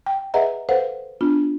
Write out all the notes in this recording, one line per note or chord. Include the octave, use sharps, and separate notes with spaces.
G5
G#4 B4 D#5 E5 F#5 A#5
A4 B4 C5 F5 F#5
B3 D4 F4